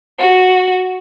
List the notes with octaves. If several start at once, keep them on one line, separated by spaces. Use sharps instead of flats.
F#4